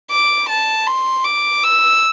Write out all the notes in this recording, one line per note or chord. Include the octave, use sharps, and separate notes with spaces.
D6
A5
C6
D6
E6